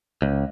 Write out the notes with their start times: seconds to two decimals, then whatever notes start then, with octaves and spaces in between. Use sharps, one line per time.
0.22 C#2